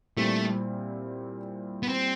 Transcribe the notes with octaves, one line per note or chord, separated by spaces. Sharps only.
A#2 G3 A3 C4 E4
B3
C4